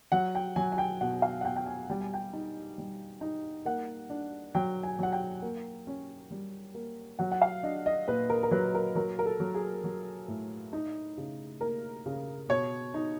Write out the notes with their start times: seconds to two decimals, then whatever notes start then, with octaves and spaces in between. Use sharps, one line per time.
0.12 F#3 F#5
0.35 G5
0.56 F#3 G#5
0.72 G#5
0.78 G5
1.01 B2 F#5
1.22 F5
1.41 F#5
1.45 B2 G5
1.56 G5
1.66 G#5
1.90 G3 G5
2.01 G#5
2.14 G5
2.33 D#4
2.78 G3
3.21 D#4
3.65 A#3 F#5
4.10 D4
4.55 F#3 G5
4.83 G#5
4.99 F#3 F#5
5.12 G5
5.42 A#3
5.87 C#4
6.31 G3
6.75 A#3
7.19 F#3 F#5
7.32 F#5
7.42 F5
7.63 D4 D#5
7.86 D#5
8.08 A#2 B4
8.30 A#4
8.43 A#4
8.51 F#3 B4
8.75 A#4
8.95 F#3 A#4
9.19 A#4
9.26 A4
9.40 F#3
9.54 G#4
9.84 F#3
10.28 A2
10.73 D#4
11.18 C#3
11.61 A#3 A#4
12.06 C#3
12.49 B2 C#5
12.94 D#4